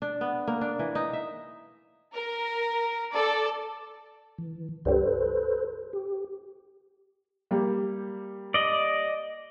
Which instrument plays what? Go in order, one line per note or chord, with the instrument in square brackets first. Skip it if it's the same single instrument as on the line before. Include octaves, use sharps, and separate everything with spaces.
[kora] D4
B3
A#3
D4
E3
D#4
E5
[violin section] A#4
A4 D5
[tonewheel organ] E3
[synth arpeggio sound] C#2 G2 G3 [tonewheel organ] A4 B4 C5
[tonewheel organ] G4
[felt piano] G3 A#3 G4
[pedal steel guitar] D5 D#5